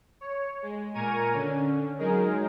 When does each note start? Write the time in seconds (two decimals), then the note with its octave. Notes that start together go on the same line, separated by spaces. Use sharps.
0.21 C#5
0.62 G#3
0.94 A#2 A#4 G#5 A#5 C#6 D#7
1.33 D3 C#4
1.98 F#3 G#3 D#4 G#4 A#4